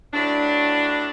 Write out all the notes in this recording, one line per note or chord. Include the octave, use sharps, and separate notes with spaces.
A2 F#3 D4